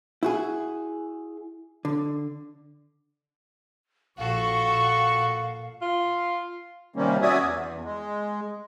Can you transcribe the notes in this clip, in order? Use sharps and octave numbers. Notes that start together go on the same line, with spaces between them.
E4 F#4 G#4
D3
A#1 F#4 A4 F5 C#6
A#2
F4
C3 D#3 G3 A#3 C#4
C#4 F#4 D5 E5 G#5 D#6
E2
G#3